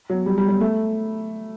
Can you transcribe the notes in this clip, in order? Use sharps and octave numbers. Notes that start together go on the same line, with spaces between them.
F#3
G3
G3
G3
A3